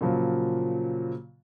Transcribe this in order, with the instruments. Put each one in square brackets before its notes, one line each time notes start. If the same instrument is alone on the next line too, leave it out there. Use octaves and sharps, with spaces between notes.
[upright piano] A#2 C#3 F3 F#3